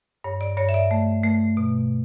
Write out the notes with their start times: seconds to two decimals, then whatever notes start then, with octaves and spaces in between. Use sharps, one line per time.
0.24 G2 C#5
0.41 D5
0.57 G2 C#5
0.69 E5
0.74 D5
0.91 A3
1.23 A3
1.57 B2